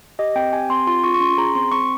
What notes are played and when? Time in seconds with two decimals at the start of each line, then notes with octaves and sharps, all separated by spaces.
0.19 G4 D#5
0.36 C4 G5
0.53 G4 G#5
0.70 C4 C6
0.87 F4 C6
1.04 F4 C#6
1.14 C#6
1.20 C#4 C6
1.38 G#4 A#5
1.55 C4 C6
1.71 C4 C#6